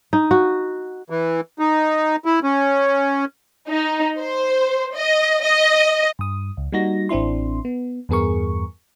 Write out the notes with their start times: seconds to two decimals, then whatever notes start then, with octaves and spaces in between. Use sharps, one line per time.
0.13 D#4
0.31 F#4
1.10 E3
1.59 D#4
2.25 E4
2.43 C#4
3.69 D#4
4.19 C5
4.95 D#5
5.43 D#5
6.19 G2 D#6
6.57 C#2
6.72 G3 A#3 D#4 F#4 A#6
7.09 A1 C4 D4 E4 C6
7.65 B3
8.09 E2 G2 B3 G#4 A#4 C#6